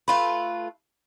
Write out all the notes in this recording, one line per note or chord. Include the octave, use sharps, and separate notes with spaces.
A3 F4 B4